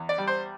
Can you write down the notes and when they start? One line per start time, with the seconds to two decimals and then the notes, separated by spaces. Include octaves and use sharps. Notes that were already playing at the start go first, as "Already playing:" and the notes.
Already playing: E2
0.09 D5
0.18 G3
0.27 C5